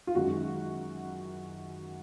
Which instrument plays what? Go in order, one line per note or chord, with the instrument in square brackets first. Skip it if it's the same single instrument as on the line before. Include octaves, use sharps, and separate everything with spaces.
[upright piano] F4
F#2 D#3 G#3 F#4